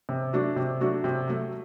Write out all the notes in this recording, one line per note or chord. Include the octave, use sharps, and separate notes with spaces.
C3
F#3 A3 D4 F#4
C3
F#3 A3 D4 F#4
C3
F#3 A3